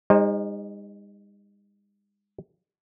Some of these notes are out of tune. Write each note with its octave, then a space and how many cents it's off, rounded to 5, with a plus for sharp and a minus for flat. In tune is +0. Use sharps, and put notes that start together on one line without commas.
G#3 -45 D#4 +0 C5 +15